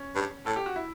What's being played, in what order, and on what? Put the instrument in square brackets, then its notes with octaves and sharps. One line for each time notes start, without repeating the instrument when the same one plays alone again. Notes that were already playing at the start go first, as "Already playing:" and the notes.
Already playing: [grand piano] C#4
[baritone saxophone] G2
[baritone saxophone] A2 [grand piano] A4
[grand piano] G4
F#4
E4